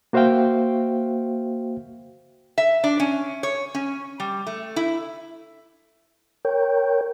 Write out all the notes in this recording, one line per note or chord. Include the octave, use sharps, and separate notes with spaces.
A#3 F#4 C5 E5 F5 G5
E5
D4
C#4
C#5
C#4
G3
A3
E4
A#4 C#5 G5